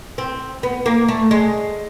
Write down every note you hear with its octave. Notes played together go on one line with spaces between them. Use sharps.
C4
B3
A#3
A3
G#3